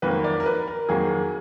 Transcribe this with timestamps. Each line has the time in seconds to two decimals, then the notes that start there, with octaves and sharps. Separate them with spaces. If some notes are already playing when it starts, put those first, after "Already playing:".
0.02 F2 D#3 F#3 A#3 B4
0.24 D5
0.40 A#4
0.46 B4
0.67 A#4
0.89 F2 D#3 F#3 A#3 G#4